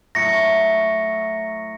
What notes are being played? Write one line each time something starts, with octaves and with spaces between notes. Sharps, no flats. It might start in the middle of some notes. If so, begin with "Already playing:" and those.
A2 F#3 E5 A#6 C#7